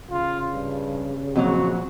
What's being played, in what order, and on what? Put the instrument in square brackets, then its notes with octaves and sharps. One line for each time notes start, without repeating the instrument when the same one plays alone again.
[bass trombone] C#3 [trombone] F4
[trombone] G2
[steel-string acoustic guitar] F2 A#2 F#3 [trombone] F#4